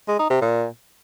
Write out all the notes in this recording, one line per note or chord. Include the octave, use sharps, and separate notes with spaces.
G#3
D#4
C3
A#2